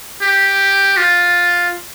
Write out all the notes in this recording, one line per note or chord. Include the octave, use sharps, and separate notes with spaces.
G4
F4